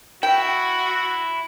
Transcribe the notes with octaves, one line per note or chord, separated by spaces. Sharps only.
E4 F#4 G5